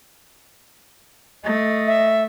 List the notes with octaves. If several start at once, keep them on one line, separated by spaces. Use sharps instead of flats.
A3 D#5
E5